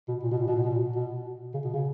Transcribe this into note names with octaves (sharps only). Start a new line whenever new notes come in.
B2
A#2
B2
A#2
B2
A#2
B2
A#2
B2
C#3
B2
C#3